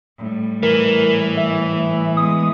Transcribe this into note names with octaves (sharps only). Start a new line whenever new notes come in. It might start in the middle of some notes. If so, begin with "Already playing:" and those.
A2 G3
E3 A#4
E5
G#3 B3 D#6